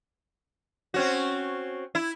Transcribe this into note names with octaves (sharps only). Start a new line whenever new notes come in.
C4 C#4 F#4
E4